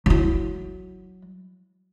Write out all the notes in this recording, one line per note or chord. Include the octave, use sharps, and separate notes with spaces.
F#3 E4